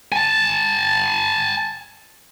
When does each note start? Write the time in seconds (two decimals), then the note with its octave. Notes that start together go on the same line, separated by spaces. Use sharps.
0.12 G#5 A5